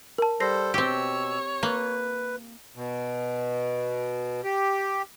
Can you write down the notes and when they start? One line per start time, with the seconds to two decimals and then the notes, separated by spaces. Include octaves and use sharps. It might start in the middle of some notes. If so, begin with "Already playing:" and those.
0.18 A#4 A5
0.40 G3 A4 C5 A#6 C7
0.74 B2 C4 G4 C#5 E6
1.63 A#3 B4
2.75 B2
4.44 G4